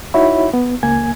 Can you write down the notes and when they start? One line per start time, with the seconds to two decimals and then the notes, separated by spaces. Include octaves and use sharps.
0.14 D#4 E4 F#4 C#5 E5 B5
0.54 B3
0.83 C#2 A#3 G#5 G#6